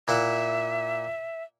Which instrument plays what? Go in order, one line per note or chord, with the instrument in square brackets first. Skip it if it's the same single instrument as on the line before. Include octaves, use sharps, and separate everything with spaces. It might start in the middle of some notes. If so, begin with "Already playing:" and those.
[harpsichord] A#2 E4 F#5 [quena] E5